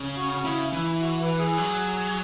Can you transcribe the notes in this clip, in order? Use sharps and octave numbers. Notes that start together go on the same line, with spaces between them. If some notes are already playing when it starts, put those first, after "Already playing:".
Already playing: C#3
F#4
C#3 E4
E3
E4
F#4
B4
G#4
F#3